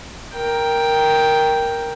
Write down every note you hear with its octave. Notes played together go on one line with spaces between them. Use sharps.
A#4 G5